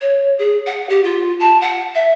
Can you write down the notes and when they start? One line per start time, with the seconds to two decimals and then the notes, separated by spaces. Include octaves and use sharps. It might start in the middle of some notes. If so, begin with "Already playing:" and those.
0.01 C#5
0.38 G#4
0.66 F#5
0.89 G4
1.04 F4
1.39 A5
1.61 F#5
1.95 E5